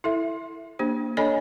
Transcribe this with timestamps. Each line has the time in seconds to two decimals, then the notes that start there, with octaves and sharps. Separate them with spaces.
0.04 E4 A4 E5
0.79 A#3 D4 G4 C5
1.17 D4 A4 C#5 D#5 G#5 B5